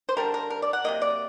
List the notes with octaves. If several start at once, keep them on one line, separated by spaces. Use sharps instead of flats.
C5
D3 G3 A#3 A#4
A#4
A#4
D5
F#5
C3 F#3 A#3 D#5
D5